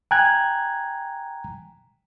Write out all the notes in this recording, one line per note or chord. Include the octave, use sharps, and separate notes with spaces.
G5 G#5 A#5 F#6 G#6